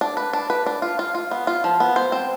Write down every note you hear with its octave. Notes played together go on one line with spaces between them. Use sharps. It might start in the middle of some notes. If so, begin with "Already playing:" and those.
D4
B4
D4
B4
D4
F4
F4
F4
B3
F4
F3
B3
C5
C4